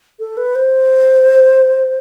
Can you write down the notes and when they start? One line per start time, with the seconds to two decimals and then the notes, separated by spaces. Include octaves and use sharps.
0.19 A4
0.37 B4
0.55 C5